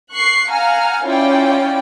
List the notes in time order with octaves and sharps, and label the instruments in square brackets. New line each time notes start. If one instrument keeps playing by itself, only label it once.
[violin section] C#6 F#6 C7
F5 F#5 G#5 A#5 F6
C#4 E4 F4 C#5 D5 G5